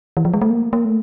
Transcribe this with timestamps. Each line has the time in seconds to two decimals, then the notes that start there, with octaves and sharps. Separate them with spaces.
0.17 E3
0.25 F3
0.34 G#3
0.42 A3
0.50 A#3
0.73 A#3
0.85 A3